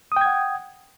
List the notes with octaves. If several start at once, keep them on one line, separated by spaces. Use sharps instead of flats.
F#5 G5 D#6 G#6